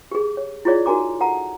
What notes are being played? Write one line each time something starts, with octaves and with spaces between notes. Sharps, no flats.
G4 G#4
C#5
E4 F4 G#4 C#5 D5
D#4 F#4 A#4 G#5 A#5 D6
A4 F#5 A5 A#5